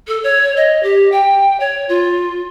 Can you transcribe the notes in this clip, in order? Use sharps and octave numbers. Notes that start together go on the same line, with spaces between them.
A4
C#5
D#5
G4
G5
C#5
F4